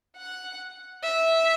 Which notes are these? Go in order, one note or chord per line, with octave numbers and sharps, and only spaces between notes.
F#5
E5